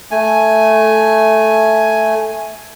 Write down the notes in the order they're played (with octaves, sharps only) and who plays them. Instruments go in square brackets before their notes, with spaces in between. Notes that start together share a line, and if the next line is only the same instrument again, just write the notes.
[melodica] A3 G#5